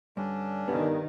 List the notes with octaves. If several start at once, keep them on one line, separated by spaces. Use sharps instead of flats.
G2 D3 C#4 D4
G2 D#3 B3